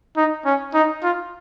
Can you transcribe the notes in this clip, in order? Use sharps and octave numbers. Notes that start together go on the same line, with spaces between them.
D#4
C#4
D#4
F4